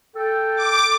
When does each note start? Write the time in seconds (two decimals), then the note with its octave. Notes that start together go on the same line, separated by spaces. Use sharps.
0.16 A4 G5
0.56 D6